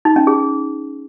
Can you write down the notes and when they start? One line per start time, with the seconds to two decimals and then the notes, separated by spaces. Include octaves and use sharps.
0.05 D#4
0.16 C#4
0.27 G#4